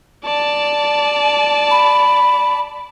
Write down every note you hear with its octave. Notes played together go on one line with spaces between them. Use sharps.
D5 A5
B5